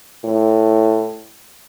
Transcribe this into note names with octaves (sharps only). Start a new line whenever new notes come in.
A2